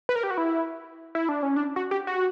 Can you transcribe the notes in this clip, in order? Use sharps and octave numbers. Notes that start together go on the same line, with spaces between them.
B4
A#4
G4
F#4
E4
E4
D4
C#4
D4
F#4
G4
F#4